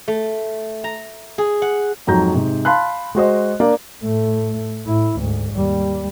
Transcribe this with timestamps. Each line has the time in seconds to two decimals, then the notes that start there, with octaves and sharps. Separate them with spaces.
0.08 A3
0.84 A#5
1.38 G#4
1.62 F#5
2.07 F2 G#2 F#3 A#5 G6
2.34 G#2 C3
2.65 F5 A5 B5 C6 F#6
3.15 G#3 F#4 C5 D#5
3.60 A#3 D4 A#4 D5 F5
4.02 A2 A3
4.86 A2 E4
5.18 D2 G#2
5.52 D#2 G3